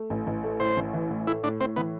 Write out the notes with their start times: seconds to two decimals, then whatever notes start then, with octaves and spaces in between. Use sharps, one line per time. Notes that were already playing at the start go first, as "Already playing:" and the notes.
Already playing: A3
0.10 A1
0.27 A1
0.44 A3
0.60 A2 C5
0.77 A1
0.94 E3
1.10 A2
1.27 A3 E4
1.43 A2 D4
1.60 A2 C4
1.76 E3 B3